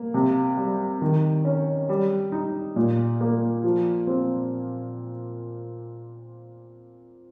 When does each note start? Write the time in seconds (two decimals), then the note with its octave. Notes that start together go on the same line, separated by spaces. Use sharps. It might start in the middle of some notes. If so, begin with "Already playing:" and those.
Already playing: A#3
0.14 C3
0.57 G3
1.02 D#3
1.45 C#4
1.89 G3
2.32 D#4
2.76 A#2
3.21 A#3
3.64 F3
4.07 C4